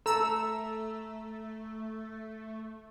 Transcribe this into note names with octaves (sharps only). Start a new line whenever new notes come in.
A3 A4 A#5 E6